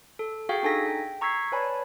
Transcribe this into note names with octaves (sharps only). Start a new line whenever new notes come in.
A4
F#4 G#4 F5 G5 C#6
D4 D#4 A4 G#5 A#6 B6
G5
A#5 C#6 E6 G#6 B6 C7
B4 C#5 D5 G#5 A5 B5